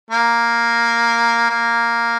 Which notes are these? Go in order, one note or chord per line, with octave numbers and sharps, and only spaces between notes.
A#3
A#3